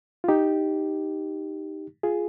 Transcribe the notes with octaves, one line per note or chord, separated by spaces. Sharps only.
F4
D#4 G4
F4 G#4